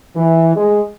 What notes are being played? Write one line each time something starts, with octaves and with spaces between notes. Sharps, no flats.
E3
G#3